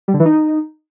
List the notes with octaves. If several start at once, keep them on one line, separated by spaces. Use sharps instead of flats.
G3
D3
E3
D#4